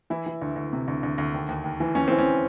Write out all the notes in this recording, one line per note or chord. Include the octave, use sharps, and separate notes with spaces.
E3 E4
E3
D2
D2
C3
D2
D2
D2
D#2
D#2
D#2
E3
E3 C#4
E3 C4
C#4